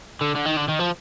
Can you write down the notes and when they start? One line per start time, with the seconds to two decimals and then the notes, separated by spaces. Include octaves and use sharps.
0.21 D3
0.36 D3
0.46 D#3
0.57 D3
0.69 D#3
0.80 F3